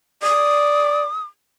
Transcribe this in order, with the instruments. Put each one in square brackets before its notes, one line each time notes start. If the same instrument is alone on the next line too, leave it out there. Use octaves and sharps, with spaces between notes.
[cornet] D5 [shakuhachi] D#6